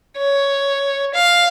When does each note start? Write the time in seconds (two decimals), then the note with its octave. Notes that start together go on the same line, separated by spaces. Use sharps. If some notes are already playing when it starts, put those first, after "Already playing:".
0.17 C#5
1.14 F5